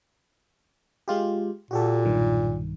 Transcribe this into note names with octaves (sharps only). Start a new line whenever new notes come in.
G#3 F4 G4
A#2 F#4 G4 A4
B1 G2 D#3